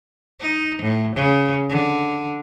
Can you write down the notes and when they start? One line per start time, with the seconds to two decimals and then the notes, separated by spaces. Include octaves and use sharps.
0.41 D#4
0.82 A2
1.16 C#3
1.70 D3